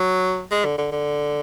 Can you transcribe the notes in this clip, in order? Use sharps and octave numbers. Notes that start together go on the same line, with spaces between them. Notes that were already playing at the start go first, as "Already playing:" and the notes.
Already playing: F#3
G#3
D3
D3
D3